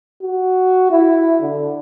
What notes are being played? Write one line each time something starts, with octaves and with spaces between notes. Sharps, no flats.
F#4
E4
D3